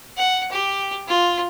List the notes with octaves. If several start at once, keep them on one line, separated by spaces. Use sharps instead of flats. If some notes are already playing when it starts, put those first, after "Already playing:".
F#5
G4
F4